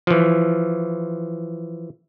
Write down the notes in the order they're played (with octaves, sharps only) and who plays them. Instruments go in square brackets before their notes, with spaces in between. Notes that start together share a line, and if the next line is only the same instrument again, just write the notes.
[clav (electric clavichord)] E3 F3